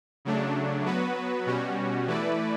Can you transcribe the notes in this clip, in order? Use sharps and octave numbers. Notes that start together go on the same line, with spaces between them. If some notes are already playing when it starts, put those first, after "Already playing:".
C#3 F#3 A3 D4
F#3 B3 F#4 B4
B2 G3 C#4 F#4
E3 A3 E4 B4 D5